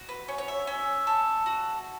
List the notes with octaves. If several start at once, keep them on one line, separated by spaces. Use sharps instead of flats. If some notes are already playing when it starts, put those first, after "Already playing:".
Already playing: F#4
B4
C#4 C#5
C#5
E5
C#4 E5
A4
F#4